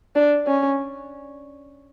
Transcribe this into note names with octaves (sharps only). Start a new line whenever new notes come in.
D4
C#4